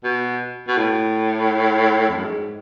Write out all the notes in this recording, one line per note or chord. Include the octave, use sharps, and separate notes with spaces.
B2
B2
A2
F2
F#2
G#2